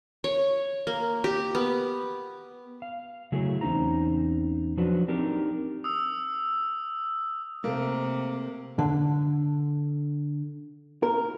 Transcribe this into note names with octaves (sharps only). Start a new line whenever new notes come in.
C#5
A#3
G4
B3
F5
C#3 F#3 A3 E4 G#4 A#4
E2 C4 C#4 D#4 C5 A#5
F3 F#3 D4 F#4 B4
C4 D4 D#4 G4 A#4
D#6 E6
C3 A3 A#3
D3
A#4